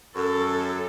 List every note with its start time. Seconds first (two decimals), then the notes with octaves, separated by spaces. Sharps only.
0.15 F#2 A4